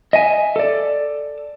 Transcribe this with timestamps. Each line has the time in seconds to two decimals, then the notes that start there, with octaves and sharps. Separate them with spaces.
0.13 D#5 E5 G#5
0.56 A4 D5